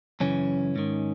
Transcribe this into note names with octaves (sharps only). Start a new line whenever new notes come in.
F#2 C#3 E3 C#4
G#2 D#3